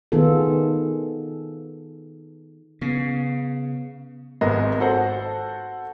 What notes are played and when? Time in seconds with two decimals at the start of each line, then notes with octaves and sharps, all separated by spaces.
0.12 D#3 B3 F4 G#4 A4
2.81 C#3 B3
4.41 G#1 G#2 B3 G#4 B4 D#5
4.80 F#4 A4 C5 F#5